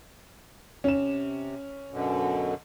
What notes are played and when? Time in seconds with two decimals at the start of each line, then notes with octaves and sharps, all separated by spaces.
0.84 C3 C#4 E7
1.91 F#2 B2 D3